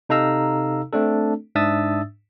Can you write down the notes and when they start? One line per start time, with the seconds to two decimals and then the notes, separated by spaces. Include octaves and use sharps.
0.09 C3 D#4 A4 F5 A#5 E6
0.93 A3 C4 D4 A4
1.55 G#2 D4 E5 D#6 E6 A6